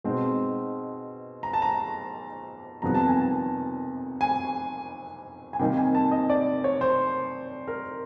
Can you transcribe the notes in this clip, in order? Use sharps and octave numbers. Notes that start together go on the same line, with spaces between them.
B2 G#3 C4 D#4
A#5
A5
A#5
F2 C3 D#3 G3 B3 A#5
A5
G#5
A5
G#5
G#5
C3 D#3 G3 A#3 D#4 G5
G#5
A5
D#5
D5
C#5
C5
A#4